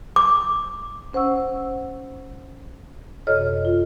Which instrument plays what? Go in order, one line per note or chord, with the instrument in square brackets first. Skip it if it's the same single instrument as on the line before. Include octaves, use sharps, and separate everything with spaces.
[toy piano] D6
[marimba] C#4 C5 F#5 C#6 E6
F#2 C3 A4 C#5 D#5 F6
F4